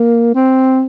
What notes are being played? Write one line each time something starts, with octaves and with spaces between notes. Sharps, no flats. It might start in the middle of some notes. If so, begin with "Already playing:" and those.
Already playing: A#3
C4